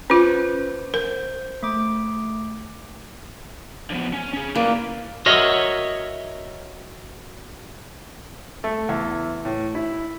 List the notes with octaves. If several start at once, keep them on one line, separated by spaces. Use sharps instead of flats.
C#4 F4 B4 C5
A#4 C5
A3 D6
D3 F3 B3
C#4
C#4 G#4
A#3 E4 B4 D5
F#4 A#4 C#5 D#5 E5
A3
E2
A2
E4